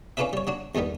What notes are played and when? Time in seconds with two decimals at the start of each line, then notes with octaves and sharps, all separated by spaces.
0.17 C#4 D4 F4 A4 B4 E5
0.33 G3 C#5
0.47 F#3 D4 F#4
0.75 E2 G2 D#3 G3 B3